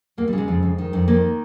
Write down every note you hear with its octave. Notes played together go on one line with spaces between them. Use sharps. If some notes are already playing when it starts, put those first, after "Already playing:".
D#2 A#3
G3
C#3
G#3
F2
F2
D#3
F2
D#3 A#3